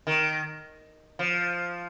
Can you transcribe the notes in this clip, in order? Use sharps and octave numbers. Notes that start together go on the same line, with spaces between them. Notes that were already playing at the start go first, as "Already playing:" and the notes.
D#3
F3